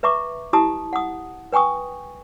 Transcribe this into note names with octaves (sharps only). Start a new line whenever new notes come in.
B4 E5 A#5 C#6 D6
E4 G4 A5 A#5 D#6
F#5 D#6
B4 G5 G#5 C#6 D#6